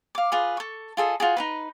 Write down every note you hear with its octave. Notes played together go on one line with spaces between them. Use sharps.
F5 D6
F4 G#4 B4
A4 C#6
F4 G#4 A4 D#5
F4 F#4 G#4
D#4 F#4 B4